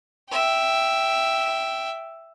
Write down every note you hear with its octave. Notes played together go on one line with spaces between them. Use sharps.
E5 G5